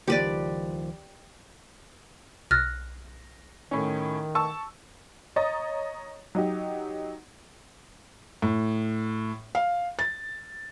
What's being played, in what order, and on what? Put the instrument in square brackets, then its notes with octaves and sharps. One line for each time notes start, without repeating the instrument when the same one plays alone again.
[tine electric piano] C#2 D#3 F3 [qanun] G4 B4 D5
[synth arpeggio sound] B1 [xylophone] F6 F#6 A6 [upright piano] A#6
[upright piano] A2 C#4 [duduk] D#3
[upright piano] A5 C#6 E6
[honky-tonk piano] C#5 D#5 A#5 D#6 A6
F#3 D#4 G4
[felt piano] A2
F5
A6